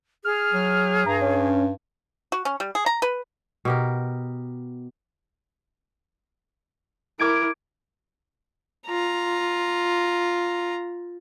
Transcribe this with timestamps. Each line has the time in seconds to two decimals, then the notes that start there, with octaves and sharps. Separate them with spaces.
0.25 G#4 F6
0.53 F#3 F6
1.06 G2 A#5
1.21 C#4
2.32 F#4
2.45 C#4
2.60 G3
2.75 G#4
2.86 A#5
3.02 B4
3.65 B2 G4 A#4
7.19 E4 A#4 D6 G#6 D7
8.87 F4 A#5